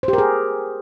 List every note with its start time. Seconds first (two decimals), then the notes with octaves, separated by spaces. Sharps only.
0.03 C5
0.08 G4
0.13 A#4
0.18 G#4